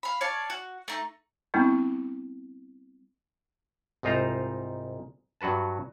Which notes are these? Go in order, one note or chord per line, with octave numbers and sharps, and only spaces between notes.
F5 B5
C#5 D5 F5 A5
F#4
A3 D#4
G3 B3 C4 D4 E4
C2 G#2 D#4 F4 C5 A#5
G2 F#3 F#4 B4 A5